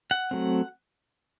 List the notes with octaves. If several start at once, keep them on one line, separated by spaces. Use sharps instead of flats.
F#5
F#3 A3 C4